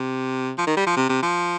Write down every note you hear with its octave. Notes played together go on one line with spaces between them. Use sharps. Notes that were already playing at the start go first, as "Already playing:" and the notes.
Already playing: C3
F3
D#3
G3
F3
C3
C3
F3